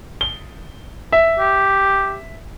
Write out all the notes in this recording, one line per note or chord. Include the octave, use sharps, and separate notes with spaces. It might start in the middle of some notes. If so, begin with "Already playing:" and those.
G7
E5
G4